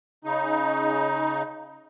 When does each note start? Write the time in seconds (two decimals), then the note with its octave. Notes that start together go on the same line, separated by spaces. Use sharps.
0.24 C#3 D#4